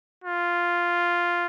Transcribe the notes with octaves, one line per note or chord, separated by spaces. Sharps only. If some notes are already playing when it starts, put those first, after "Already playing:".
F4